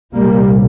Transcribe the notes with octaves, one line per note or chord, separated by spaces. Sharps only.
C2 A#2 G3 A#3